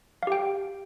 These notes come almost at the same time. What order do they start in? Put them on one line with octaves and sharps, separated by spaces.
F5 G4 G5